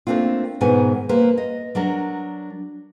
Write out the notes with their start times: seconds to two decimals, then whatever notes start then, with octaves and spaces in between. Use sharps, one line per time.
0.07 A3 A#3 C4 D4 F4
0.61 G#2 B2 D#3 B3 D#4 G#5
1.09 A#3 B4 C5
1.38 D#5
1.75 F#3 D4 A#4